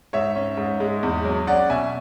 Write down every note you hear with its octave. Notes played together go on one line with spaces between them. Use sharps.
G#2 C#5 E5
C#4
G#2
G#3
E2
F#3
C#4 D5 F#5
B2 E5 G#5